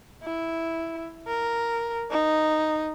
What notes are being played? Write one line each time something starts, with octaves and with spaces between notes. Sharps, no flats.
E4
A#4
D#4